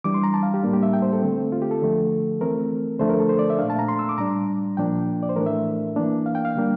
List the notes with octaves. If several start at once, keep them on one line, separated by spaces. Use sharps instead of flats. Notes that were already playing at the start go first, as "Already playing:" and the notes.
E3 G3 D4 D6
C6
A#5
A5
F5
G4
A2 G3 A#3 D4
G4
E5
G5
C5
A4
D3 A3 C4
F4
G4
A4
D3 F3 A3
E3 A3 C4 A#4
D3 F3 A3 D4 C5
A#4
A4
C5
D5
E5
A#2 A3 D4 F5
A5
A#5
C6
E6
D6
A2 G3 D4 A#5
A#2 F3 A#3 D4 G5
D5
C5
A2 E3 A3 D4 A#4
E5
E3 A#3 D4
F5
G5
F5
D3 G3 A#3 D4